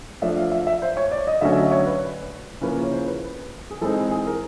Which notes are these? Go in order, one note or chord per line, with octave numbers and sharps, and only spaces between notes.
F3 A3 D4 E5
F5
E5
E5
C5
C#5
D5
D#5
D3 F#3 A3 C#4 E5
E5
D#5
C#5
B4
C#3 F3 A#3 C#4 E4 B4
C#5
C5
B4
G#4
E3 G#3 C4 D#4 A4
G#4
A#4